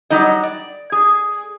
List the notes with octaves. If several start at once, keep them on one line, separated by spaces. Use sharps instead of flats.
F#3 G3 D#4 D#5
D5
G#4